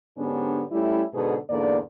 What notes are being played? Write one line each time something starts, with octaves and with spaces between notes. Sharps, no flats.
G#2 D3 B3 C#4 D4 G4
G3 A3 C#4 E4
G#2 B2 D3 B3 G#4 A4
E2 G#2 D3 A#3 D5